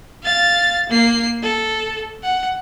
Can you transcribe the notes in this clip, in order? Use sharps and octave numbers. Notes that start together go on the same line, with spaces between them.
F5 A6
A#3 C7
A4
F#5